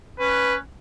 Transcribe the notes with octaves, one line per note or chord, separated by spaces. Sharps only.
C#4 B4